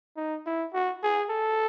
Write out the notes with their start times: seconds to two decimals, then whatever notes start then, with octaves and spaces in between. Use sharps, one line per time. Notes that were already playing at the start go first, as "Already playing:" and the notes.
0.17 D#4
0.46 E4
0.74 F#4
1.03 G#4
1.30 A4